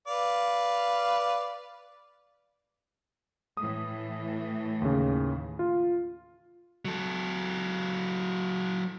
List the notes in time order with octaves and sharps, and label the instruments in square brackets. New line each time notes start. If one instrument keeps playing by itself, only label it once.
[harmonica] B4 D5 F5
[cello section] A2 E3 [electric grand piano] D#6
[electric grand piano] D#2 C#3
F4
[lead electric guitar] F#3 A4